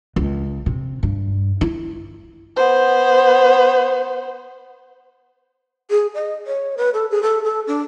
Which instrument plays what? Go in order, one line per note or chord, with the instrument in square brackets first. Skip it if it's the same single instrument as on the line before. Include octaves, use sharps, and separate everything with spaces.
[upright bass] C#2
C3
G2
E4
[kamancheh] B3 C5
[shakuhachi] G#4
D#5
C#5
B4
A4
G#4
A4
A4
D4